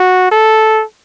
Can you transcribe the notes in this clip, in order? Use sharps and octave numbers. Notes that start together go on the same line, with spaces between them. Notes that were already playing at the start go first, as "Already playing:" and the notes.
Already playing: F#4
A4